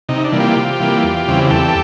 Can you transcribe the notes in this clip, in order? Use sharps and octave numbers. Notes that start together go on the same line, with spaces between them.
C3 D#4
D4
E3 G3 A#3
F4 G4
C3
E3 G3 A#3
E2
C#3 E3 G3 C4
E2 G4 A4